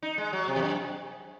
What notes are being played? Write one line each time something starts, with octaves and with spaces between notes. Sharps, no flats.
D#4
G#3
F#3
C3
E2
F#2